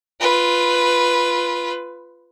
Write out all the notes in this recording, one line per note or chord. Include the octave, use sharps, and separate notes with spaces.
F4 B4